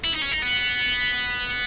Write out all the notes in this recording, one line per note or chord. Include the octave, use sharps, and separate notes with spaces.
E4
D#4
C#4
D#4
B3